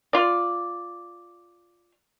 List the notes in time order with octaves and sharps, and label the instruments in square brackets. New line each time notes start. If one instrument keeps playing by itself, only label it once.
[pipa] F4 D5